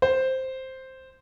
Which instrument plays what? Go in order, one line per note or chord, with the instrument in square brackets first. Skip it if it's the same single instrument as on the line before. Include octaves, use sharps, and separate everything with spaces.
[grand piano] C5